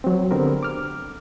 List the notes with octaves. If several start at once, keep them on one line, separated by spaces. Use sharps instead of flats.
F#3 C4
D3 B3 C4 G4 A#4
D6 F6